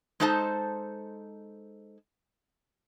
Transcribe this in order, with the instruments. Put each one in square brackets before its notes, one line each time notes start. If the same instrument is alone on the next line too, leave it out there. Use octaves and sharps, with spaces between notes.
[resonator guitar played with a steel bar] G#3 D4 D#4 A4 C5 A5